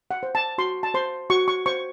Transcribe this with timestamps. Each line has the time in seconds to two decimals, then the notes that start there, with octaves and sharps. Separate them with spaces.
0.11 F#5
0.23 C5
0.35 A5
0.58 F#4 C6
0.83 A5
0.94 C5 C6
1.30 F#4 C#6
1.48 C#6
1.66 C5 C#6